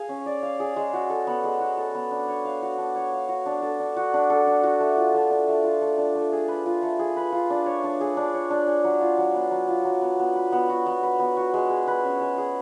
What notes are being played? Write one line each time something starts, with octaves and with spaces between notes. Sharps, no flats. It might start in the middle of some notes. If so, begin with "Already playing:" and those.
Already playing: G#4 F5
C#4
D5
F5
G#4
G#3
F#4
A4
B3
G#3
F#4
A4
B3
D4
C#5
F5
F#4
D4
C#5
F5
F#4
D4
A4
D4
F#4
D4
A4
D4
F#4
A3
F4
A3
D4
A3
F4
A3
D4
A3
G#4
B4
F4
A3
G#4
B4
F4
D4
C#5
D4
G#4
D4
C#5
D4
G#4
F#3
F4
F#3
B3
F#3
F4
F#3
B3
B3
B4
B3
F#4
B3
B4
B3
F#4
G#3
G#4
B4
C#4
G#3
G#4